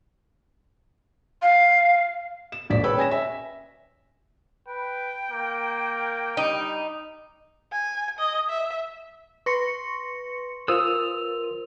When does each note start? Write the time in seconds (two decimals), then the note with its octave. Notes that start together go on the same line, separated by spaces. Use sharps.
1.42 F5
2.52 E7
2.70 E1 A#1 D5 B6
2.83 G#4 B4 C#5 G5 B5 E6
2.97 C#4 G#5 A#6 E7
3.11 E5
4.68 B4 G5
5.31 A#3
6.37 G3 D#4
7.72 G#5
8.19 D#5
8.50 E5
9.46 B4 C6 C#6 A#6 C#7
10.68 F4 A#4 C5 D#6 E6 F7